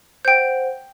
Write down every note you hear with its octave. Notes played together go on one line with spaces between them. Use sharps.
C5 F#5 G5 G6